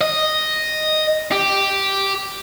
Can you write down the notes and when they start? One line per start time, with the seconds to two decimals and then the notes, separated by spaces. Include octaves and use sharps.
0.01 D#5
1.32 G4